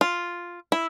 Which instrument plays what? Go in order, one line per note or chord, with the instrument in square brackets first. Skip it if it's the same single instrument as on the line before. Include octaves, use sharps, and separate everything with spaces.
[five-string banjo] F4
E4